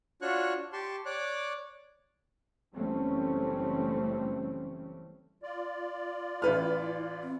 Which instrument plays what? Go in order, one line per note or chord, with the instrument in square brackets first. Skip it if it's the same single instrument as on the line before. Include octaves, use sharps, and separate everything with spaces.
[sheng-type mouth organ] D4 F4 F#4 C#5 C#6 F#6
G4 A5 C6 C#6
C#5 D5 D6 F#6
[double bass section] F#1 E3 G3 A3 C4 C#4
[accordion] F4 D5
[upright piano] A1 B4 F6 [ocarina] E4
[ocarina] C4